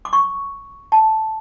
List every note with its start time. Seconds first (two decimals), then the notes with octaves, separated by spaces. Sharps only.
0.05 D6
0.13 C#6
0.92 A5